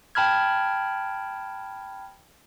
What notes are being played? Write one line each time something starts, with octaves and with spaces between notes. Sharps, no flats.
G5 A5 B5 F6 G#6